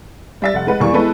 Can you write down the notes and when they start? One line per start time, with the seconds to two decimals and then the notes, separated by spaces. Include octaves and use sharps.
0.42 G3 E5 A6
0.54 F1 F#5
0.67 G#3 B4 F#5
0.80 E2 E3 G3 A#3 C#6
0.93 G#3 B3 E4 A4 B4